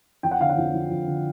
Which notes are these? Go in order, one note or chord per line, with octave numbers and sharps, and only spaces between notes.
F2 G5
F#5
D3 F5
F#5
F2
F3
F2
D3